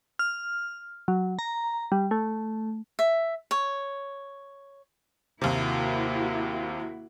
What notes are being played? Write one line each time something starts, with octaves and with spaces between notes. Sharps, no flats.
F6
F#3
A#5
G3
A3
E5
C#5
D#2 C3 A#3 E4 F#4